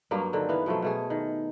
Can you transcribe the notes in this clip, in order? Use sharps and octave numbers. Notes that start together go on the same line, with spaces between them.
G2 F#3 A#3 G4
D3 D#3 C4
E3 B3 F5
B2 F3 F#3 A3
B2 A3 G#4
D#3